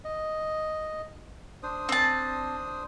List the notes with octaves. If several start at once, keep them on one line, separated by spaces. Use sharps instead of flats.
D#5
D4 C5 D#6
C4 A5